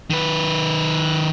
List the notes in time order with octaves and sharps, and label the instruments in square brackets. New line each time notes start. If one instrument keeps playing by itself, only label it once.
[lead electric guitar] D#3 B4